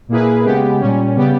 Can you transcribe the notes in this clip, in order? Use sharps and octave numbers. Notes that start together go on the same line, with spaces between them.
A#2 A#3 E4 G#4 B4
C#3 G#3 B3 G4
A#2 G3 C#4
C#3 G3 B3 G4